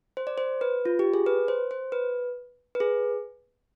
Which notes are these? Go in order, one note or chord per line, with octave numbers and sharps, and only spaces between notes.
C5
D5
C5
B4
F4
G4
G#4
B4
C5
C5
B4
B4
G#4